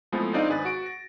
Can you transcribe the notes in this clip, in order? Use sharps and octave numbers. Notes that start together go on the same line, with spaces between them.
F3 G#3 A3 B3 C4 E4
C4 D4 D#4 D5 D#5 F5
G#1 G#4 B4 A6
F#4 D7
A#6